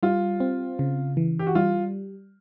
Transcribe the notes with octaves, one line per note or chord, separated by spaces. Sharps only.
G3 F4
C4
C#3
E3
G4
F#4
G3 F4